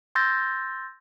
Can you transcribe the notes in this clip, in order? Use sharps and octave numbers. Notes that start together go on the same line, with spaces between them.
C6 E6 G6 A6 A#6